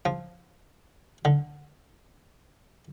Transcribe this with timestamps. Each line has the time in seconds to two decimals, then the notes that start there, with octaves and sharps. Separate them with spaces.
0.05 F3
1.25 D3